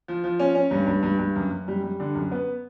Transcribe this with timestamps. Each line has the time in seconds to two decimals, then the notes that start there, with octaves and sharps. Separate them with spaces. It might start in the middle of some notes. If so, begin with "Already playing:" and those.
0.08 F3
0.24 F3
0.40 C#4
0.55 C#4
0.71 G2
0.87 G2
1.03 G2
1.19 G2
1.36 F#2
1.51 F#2
1.68 G3
1.83 G3
2.00 D3
2.15 F#2
2.32 B3